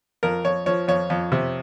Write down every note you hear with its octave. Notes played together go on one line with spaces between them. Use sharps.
F2 A#4
F2 C#5
F3 C#5
F2 C#5
F2
C3